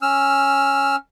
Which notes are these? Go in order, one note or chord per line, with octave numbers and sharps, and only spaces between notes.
C#4 E6 F6